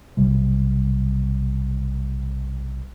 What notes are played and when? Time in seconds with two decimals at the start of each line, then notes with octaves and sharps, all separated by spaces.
0.17 B1 C3 G3